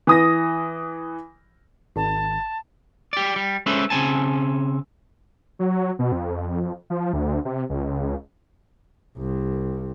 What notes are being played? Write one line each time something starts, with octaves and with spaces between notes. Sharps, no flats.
E3 D#6 A#6
G#1 A5
G4 D5
G3
G#3 C#4 A4 B4 C5 E5
C#3 B3 C4 G#5 A5
F#3
B2
F2
F3
D2
C3
C#2
C2